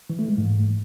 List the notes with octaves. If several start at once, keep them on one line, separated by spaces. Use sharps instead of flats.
E3
A3
G#3
G#2